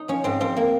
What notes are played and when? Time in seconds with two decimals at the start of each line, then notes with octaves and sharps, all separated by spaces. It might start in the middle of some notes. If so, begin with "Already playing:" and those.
Already playing: D#4
0.08 F3 C#4
0.24 G#2 C4
0.40 F3 C4
0.57 A#3